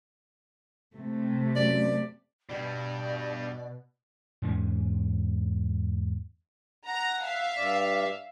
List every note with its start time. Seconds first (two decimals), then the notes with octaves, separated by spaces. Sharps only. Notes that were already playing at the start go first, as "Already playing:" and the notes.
0.94 C3 A3
1.56 F#2 D5
2.49 G2 B2 G3 D5
4.42 E2 G#2 A3 C#4
6.87 F#5 A#5
7.25 E5 F5
7.57 G2 D5